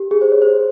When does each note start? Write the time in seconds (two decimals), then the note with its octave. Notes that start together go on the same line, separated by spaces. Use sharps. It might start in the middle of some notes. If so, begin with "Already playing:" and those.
Already playing: G4
0.11 G#4
0.21 C5
0.32 C#5
0.42 C5